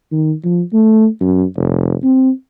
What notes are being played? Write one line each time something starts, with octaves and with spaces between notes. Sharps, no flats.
D#3
F3
A3
F#2
F1
C4